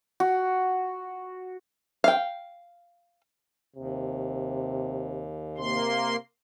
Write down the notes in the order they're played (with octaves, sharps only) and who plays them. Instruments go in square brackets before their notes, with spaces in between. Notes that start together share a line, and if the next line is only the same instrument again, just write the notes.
[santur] F#4
[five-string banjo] F5 G5
[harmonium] D#2 [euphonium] C3
[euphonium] C3 [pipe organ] A#3 C6